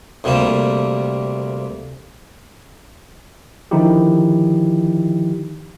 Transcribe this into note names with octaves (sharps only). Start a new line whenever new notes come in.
D2 C3 G3 A#3 A5
D3 D#3 F3 D#4 E4 G4